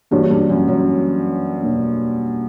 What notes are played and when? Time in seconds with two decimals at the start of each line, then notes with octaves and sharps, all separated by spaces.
0.11 G2 E3 A#3 D4 F#4 C#5
0.31 G2
0.49 F#2
0.68 F#2
1.63 E2 B2 A#3 D4